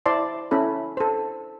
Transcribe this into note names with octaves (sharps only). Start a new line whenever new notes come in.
E4 C5 D5 A5 C6
C#4 E4 A4 B5
A4 C5